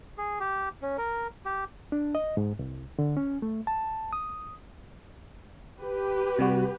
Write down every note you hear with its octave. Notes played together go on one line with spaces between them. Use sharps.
G#4
G4
C#4
A#4
G4
D4
D#5
G#2
C2
D3
C#4
A3
A5
D#6
G4 B4
C3 G3 F#4